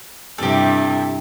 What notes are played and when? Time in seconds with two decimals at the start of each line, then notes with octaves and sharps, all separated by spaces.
0.38 G2 C3 E4 G4 A4